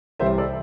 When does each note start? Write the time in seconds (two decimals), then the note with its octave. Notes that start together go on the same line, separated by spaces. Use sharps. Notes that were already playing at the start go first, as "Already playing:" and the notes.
0.19 C2 C3 E3 G3 C5 E5
0.38 A4 D5